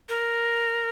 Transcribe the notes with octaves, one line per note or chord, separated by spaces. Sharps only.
A#4